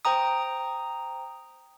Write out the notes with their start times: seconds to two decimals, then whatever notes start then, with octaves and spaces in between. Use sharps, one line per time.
0.05 C5 G5 A#5 D#6